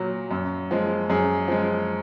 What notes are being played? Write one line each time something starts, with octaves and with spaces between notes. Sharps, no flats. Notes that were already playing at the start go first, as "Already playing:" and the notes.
Already playing: A#2 F#3
F#2
F3 G#3
F#2 G#4
F3 G#3